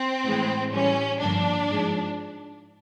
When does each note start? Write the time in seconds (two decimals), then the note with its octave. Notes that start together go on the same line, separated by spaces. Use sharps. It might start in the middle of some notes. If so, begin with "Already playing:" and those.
Already playing: C4
0.24 A2 E3 G#3
0.73 A2 E3 G3 C#4
1.20 G2 D3 F3 A#3 D4
1.69 G#2 F3 G#3